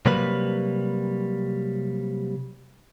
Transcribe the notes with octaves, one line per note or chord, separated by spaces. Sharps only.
C3 F#3 G3 A#3 B4